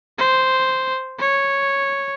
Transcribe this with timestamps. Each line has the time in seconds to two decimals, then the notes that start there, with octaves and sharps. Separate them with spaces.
0.18 C5
1.20 C#5